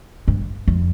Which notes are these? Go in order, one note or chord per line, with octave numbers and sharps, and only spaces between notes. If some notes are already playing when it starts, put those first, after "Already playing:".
G2
F2